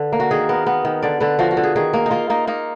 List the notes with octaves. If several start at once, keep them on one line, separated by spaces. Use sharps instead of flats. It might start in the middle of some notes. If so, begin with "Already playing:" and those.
Already playing: D3 B4
A#3
F#4
D#3 G#4
B3 A#4
B3
D#3
D3 D5
D3 B4
F3 F#4
F#4
D3
G#4
D#3 G#4
A#3
D#4
A#3 F4
A#3 D#4
A#3 D#4